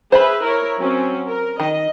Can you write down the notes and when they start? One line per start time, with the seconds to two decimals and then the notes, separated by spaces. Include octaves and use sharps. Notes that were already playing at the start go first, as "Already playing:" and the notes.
0.12 G#4 B4 C5 E5 F5 B5
0.45 E4 A#4 C#5
0.80 F#3 C4 C#4
1.28 A#4
1.60 D#3 D#5